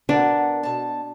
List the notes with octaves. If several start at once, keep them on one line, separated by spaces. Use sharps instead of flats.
B2 D4 A#4 F#5
B2 A5